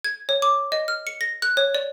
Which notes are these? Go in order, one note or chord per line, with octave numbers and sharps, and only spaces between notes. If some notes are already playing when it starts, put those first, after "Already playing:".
G#6
C#5
D6
D#5
F6
C#7
A#6
F#6
C#5
D5